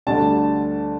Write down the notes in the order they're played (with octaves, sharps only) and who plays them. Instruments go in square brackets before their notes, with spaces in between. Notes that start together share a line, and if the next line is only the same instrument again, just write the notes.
[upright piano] D2 D3 G3 D4 A5